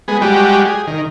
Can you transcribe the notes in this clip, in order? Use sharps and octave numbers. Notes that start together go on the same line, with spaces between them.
G#3 B3 G#4
G3 G#3 F#4 G4
G#4
D#3